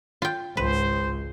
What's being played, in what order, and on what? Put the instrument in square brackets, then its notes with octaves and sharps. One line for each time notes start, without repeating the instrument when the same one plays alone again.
[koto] F4 G5
[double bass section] G#1 C#2 G#3 [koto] B4 [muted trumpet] C5